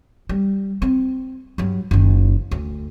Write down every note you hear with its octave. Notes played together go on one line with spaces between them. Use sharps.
G3
C4
G2 F#3
F#1 D#3
D2